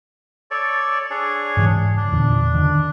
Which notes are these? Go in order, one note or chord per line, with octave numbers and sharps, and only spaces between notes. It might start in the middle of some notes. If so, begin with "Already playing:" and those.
A4 C#5 D5
D4 G#4 C#5
G#2 C#3 E3
D4
E2 A#2 D3
D3 D#3